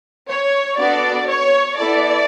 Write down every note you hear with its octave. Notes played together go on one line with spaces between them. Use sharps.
C#5
B3 D4 F#4 A4 D5
C#5
B3 E4 A4 D5